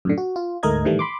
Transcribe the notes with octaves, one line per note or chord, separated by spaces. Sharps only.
F#2 A2 D3
F#4
F4
D2 G#2 A3 A#4 D#5 G#6
A2 D#3 E3 G3 A3
B5 C6 D6